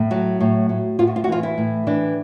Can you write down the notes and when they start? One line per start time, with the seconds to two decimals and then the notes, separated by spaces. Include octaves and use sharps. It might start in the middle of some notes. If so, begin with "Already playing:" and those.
Already playing: A2
0.11 F#3 F#4
0.40 A2
0.69 A2
0.99 A2 F4
1.07 F#4
1.16 F4
1.24 F#4
1.28 E3 F4
1.43 E4
1.58 A2
1.87 E3 D4